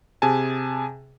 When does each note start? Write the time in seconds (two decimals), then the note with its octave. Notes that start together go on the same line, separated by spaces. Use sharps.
0.22 C3 G#4 G#5 A5